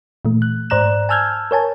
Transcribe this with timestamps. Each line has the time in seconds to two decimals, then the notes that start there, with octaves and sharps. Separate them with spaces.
0.25 A#2 E3 A3
0.42 F#6
0.70 G#2 C5 D5 A#5 F#6 E7
1.09 G#5 A5 E6 F6 G6 G#6
1.51 A#4 C#5 G#5 A5